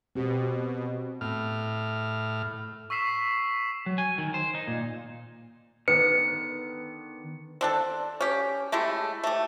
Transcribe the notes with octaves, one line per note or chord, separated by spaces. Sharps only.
B2 C4 G4
A2 F6
C#6 E6 B6 C7 E7
F#3
G#5
D#3
C5
D#4
A#2
D3 D#3 B3 B4 C#7
C4 D4 A4
C#4 G4
G#3 A3 E4 G4
A3 G4